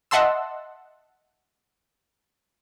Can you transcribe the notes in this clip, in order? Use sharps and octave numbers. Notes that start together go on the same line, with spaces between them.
D#5 E5 F#5 A5 C6 E6